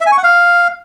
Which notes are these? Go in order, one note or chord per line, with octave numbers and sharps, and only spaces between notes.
E5
G#5
C#6
F#5
F5